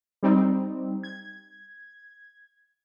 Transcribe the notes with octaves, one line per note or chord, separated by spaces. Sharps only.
G3 C4 D#4
G#6